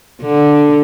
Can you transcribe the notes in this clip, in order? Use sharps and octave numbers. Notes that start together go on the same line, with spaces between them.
D3